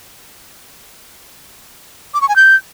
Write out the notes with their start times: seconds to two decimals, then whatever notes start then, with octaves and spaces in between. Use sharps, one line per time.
2.14 D6
2.21 C#6
2.29 G#5
2.36 G6